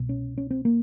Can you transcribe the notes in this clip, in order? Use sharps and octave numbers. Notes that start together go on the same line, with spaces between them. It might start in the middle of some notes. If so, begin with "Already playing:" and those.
Already playing: C2 B2
C#4
C#4
C4
A#3